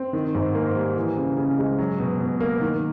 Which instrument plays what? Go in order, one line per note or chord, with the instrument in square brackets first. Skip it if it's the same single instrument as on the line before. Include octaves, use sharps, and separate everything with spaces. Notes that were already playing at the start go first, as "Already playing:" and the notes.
Already playing: [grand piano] C4
D#3
G#2
A#3
G3
E3
C#3
C#3
G#3
F#3
B2
B2
A#3
D#3